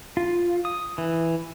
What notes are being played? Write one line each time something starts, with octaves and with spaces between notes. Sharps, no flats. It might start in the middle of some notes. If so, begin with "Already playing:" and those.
F4
D#6
E3